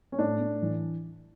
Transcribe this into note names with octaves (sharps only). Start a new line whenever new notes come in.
C#4
A2 D4
A2
E3